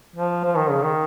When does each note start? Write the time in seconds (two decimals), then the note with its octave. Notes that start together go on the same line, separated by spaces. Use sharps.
0.16 F3
0.44 F3
0.57 D#3
0.71 C#3
0.84 D#3